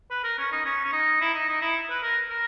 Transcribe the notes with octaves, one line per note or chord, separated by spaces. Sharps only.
B4
A#4
C#4
D#4
C#4
C#4
D#4
E4
D#4
D#4
E4
B4
A#4
A#4